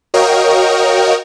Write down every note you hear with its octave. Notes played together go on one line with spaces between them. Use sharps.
F#4 A#4 C#5 D#5 F5 G5